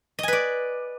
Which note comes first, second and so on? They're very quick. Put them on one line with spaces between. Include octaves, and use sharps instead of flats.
D#5 G#5 B4 D5